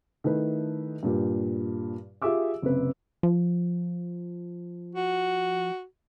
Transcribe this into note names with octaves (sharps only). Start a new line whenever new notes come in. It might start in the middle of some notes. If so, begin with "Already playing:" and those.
D#3 A3 E4 B4
G2 A#2 G4
F4 G4 G#4 E5 D6 E6
F#1 C3 B4
F3
F#4